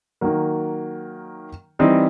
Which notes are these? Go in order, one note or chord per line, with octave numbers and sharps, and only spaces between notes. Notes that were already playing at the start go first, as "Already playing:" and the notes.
D#3 F#3 A#3
E3 G3 C4 D#4